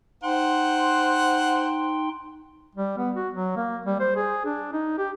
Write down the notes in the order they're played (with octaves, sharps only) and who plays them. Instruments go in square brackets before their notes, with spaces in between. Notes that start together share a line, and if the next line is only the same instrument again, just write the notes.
[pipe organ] D#4 G5 C6 [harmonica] C5 F#5
[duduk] G3
B3
F#4
F#3
A#3
G3
C5
G#4
D4
D#4
G4